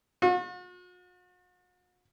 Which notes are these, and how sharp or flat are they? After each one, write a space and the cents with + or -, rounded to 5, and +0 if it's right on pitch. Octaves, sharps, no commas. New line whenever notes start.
F#4 -45